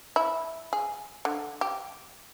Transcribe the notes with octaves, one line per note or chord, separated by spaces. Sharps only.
E4
G#4
D3
G4